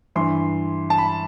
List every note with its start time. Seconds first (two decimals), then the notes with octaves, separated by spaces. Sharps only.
0.15 G2 E3 C6
0.90 A5
0.98 B5